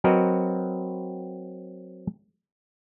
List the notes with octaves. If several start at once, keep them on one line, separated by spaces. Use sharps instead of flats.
F#3 C4 F#4 A#4 B4 D#5